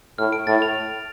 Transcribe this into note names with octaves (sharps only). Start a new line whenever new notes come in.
A2 F6
D7
A2 A6
F7